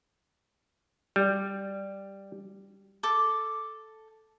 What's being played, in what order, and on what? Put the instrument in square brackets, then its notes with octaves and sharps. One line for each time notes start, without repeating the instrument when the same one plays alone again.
[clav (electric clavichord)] G3
[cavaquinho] A4 D6